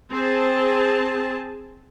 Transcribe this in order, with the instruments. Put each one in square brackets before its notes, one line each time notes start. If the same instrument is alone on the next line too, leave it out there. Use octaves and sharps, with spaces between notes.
[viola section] C4 G#4 A5